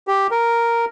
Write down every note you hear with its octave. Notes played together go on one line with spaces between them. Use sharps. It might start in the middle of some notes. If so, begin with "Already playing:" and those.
G4
A#4